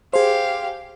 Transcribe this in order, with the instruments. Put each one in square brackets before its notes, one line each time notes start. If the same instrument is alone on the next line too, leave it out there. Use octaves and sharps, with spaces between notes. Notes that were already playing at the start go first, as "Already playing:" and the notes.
[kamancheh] G4 F5 [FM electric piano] G#4 C5